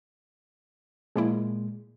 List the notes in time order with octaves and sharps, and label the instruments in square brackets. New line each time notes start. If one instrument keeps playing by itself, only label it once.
[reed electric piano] A#2 G#3 [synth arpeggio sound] F3 A#3 E4